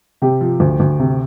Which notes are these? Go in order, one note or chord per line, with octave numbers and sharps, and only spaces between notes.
C3 G4
F3
D2
D2
C3